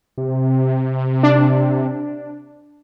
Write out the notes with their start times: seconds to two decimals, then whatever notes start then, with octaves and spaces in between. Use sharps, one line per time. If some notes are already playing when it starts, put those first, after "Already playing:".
0.18 C3
1.23 D4